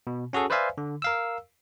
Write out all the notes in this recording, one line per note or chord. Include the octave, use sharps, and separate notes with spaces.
B2
C#4 F#4 G#4 A4
B4 C5 D5 E5 F5 G#5
D3
A#4 F5 E6